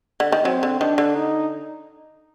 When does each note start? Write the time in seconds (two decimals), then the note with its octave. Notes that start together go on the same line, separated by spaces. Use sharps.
0.20 D3
0.32 D#3
0.45 F#3 C4
0.63 D3
0.81 D#3 D4
0.98 D3
1.15 D#4